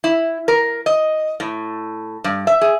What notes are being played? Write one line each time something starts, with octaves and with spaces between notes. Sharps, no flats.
E4
A#4
D#5
A2
G2
E5
G#4